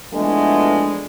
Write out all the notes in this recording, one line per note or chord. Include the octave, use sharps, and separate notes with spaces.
E3 F3 G#3 A3 B3 D4